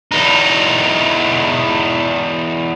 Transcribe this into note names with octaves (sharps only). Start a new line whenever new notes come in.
E2 D#4